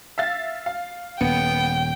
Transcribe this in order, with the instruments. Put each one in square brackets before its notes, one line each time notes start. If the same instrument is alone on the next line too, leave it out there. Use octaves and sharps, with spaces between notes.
[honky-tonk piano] E5 F5 A6
F5
[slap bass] D#1 [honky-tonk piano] B3 [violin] G5